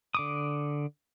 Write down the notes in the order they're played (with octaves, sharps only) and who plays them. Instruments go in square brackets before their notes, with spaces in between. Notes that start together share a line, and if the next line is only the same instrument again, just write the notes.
[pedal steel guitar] D3 D6 D#6